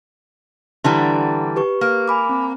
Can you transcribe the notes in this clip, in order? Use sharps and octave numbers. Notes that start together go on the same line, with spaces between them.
D3 E3 G3 F#5 A#5 C6
G4 B4 C#6
A#3
G#5 B5 D6
C4